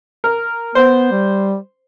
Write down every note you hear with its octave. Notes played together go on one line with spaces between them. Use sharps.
A#4
B3 C5
G3